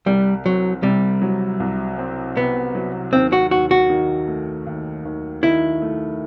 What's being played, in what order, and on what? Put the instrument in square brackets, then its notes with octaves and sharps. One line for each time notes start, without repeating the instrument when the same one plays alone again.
[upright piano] C2 [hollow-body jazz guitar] G3
[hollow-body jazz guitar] F#3 [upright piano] C4
[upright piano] C3 [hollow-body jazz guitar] G3
[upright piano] F#3
C2
C4
[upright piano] C3 [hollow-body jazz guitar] B3
[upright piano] F#3
[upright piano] D#2 [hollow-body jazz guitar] C4
[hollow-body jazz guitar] F#4
[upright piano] D#2 [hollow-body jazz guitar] F#4
[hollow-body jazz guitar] F#4
[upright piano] D#3
A3
D#2
D#2
[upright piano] D#3 [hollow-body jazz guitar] E4
[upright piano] A3